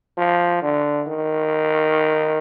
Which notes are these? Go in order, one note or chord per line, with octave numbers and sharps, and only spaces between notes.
F3
D3
D#3